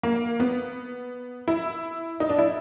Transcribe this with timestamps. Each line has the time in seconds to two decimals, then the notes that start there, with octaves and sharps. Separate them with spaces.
0.03 A#3
0.40 B3
1.48 E4
2.20 D#4
2.29 D4
2.38 E4